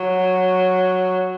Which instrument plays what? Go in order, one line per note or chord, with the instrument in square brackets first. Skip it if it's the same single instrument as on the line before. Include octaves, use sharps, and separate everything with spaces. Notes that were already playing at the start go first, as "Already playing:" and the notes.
Already playing: [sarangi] F#3